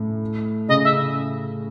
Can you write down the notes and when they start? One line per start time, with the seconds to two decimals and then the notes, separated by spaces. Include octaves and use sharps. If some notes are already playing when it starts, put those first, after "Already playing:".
Already playing: A2
0.68 C#3 D#5
0.84 E5